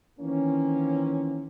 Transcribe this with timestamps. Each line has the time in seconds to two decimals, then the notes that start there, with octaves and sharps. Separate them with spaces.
0.20 D#3 E3 A#3 C4 C#4